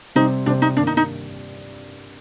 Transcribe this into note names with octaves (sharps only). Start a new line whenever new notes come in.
C3 G3 C4 D#4 G4 C5
C3 G3 C4 D4 G4 C5
D#4
G2 D#3 A#3 D4
D#4
D#4